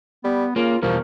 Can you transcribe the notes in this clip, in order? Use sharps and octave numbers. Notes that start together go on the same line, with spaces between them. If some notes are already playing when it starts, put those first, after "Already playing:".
G3 B3
C#3 A#3 F4
E2 B2 F3 G3 A#4